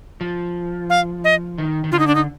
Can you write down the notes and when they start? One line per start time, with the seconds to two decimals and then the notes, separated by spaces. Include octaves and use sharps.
0.21 F3
0.90 F5
1.24 D#5
1.58 D#3
1.84 D#3
1.92 D3 F4
1.99 D#4
2.07 D4
2.15 D#4